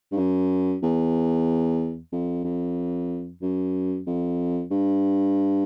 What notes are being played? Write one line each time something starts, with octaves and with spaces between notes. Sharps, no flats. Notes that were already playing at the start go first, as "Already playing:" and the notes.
G2
F#2
E2
F2
F2
F#2
F2
G2